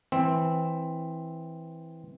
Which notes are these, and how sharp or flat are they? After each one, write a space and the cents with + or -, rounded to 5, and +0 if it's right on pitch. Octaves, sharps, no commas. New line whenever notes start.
E3 -10 C4 +0